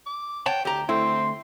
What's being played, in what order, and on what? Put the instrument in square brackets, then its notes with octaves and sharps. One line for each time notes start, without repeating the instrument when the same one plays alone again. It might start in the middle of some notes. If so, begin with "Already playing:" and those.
[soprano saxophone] D6
[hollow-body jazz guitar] C#5 F#5 A5 [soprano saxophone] G5
[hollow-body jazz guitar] D2 A#5 [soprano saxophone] G4
[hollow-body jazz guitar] D2 A3 E4 [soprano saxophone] C4 [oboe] C6